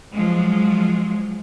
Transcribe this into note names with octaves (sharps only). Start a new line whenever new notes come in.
F3 F#3 G#3